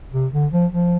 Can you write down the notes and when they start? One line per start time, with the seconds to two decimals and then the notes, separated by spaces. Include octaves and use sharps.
0.13 C3
0.32 D3
0.52 F3
0.72 F3